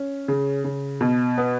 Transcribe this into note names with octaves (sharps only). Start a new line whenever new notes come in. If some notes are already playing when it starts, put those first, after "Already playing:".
Already playing: C#4
C#3
C#3
B2
B3